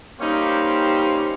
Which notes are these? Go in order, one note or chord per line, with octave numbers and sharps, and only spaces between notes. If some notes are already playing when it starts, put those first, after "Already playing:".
G3 A#3 C#4 D#4 G4 C5